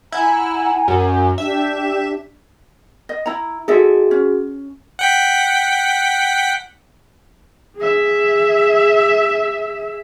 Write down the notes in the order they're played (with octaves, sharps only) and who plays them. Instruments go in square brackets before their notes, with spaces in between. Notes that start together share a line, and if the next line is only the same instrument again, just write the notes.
[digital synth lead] E4 [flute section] F#5 G#5 A#5
[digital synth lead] F#2
[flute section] D4 G4 [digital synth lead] E5
[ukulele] D#5
E4 A#5
[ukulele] D#4 A4 E5 [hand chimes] F#4 G#4
[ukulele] C#4
[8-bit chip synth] F#5 G5 B6
[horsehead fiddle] G#4 E5